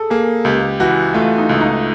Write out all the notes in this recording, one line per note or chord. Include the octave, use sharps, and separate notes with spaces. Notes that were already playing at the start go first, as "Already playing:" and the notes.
Already playing: G#4 A4
A#3 G#4
C#2 G4
E3 F#4
A3 F4
D#4
C#2
D#4